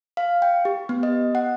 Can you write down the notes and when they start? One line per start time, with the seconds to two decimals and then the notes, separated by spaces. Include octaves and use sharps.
0.17 F5
0.42 G5
0.65 G4
0.89 B3
1.03 D#5
1.35 F#5